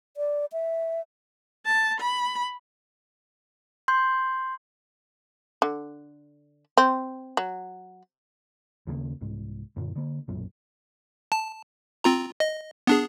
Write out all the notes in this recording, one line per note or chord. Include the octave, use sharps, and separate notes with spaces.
D5
E5
A5
B5
C6 G6
D3
C4
F#3
D#2 C#3 A3 A#3
C2 G#2
F#2 A#2 D3
D3 A#3
B1 F#2 A#2
A5
C4 F4 A#5
D#5
B3 D4 G#4